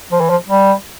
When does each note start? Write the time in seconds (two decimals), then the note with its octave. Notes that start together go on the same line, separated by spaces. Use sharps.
0.12 F3
0.21 E3
0.30 F3
0.48 G3